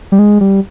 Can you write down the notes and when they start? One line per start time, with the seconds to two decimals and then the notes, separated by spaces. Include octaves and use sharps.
0.12 G3
0.19 G#3
0.41 G3